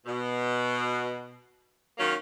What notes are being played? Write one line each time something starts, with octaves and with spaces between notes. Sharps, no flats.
B2
D#3 F#3 A#3 C#4